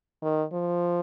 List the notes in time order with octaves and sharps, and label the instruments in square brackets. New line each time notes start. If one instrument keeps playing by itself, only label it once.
[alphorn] D#3
F3